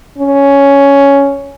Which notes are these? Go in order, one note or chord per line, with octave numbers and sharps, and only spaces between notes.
C#4